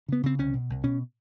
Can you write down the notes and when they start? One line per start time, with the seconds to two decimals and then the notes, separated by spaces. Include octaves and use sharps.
0.08 C#3 B3
0.23 C#3 C4
0.38 C2 C#4
0.53 B2
0.70 C2
0.84 B2 C#4